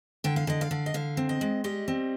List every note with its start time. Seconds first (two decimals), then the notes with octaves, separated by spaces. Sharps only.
0.24 D3 G5
0.36 F5
0.47 D3 D#5
0.61 F5
0.71 D3
0.86 D#5
0.94 D3 F5
1.17 C4
1.29 D#5
1.41 G#3
1.64 G3 D#5
1.88 C4